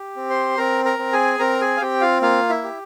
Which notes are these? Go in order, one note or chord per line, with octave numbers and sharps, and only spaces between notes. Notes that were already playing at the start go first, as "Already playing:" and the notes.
Already playing: G4
C4
C5 C6
C4 A#4 A#5
A#4 A#5
C4
G#4 G#5
C4 A#4 A#5
G#4 G#5
F5
C4 G4 G5
F4 F5
A#3 F4 F5
E4 E5
G4